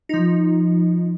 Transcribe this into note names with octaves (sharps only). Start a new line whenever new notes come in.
F3 D#4